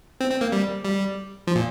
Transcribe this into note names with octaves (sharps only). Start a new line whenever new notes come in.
C4
C4
A#3
G3
G3
F3
A#2